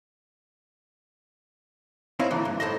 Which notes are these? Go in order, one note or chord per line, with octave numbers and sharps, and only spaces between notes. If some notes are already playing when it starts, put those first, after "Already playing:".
C4 D#4 E4 C#5 F5
E2 A#2 D3 E3
G2
A2 A4 C5 D#5